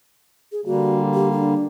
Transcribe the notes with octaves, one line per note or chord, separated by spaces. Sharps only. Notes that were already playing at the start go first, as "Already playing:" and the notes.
G#4
D3 G3 A#3 F#4
G4
D4